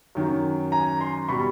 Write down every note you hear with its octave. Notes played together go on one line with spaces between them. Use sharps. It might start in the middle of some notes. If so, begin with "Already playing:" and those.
F#2 D#3 F#3
G#5 A#5
A#5 C6
B2 G3 B5 C#6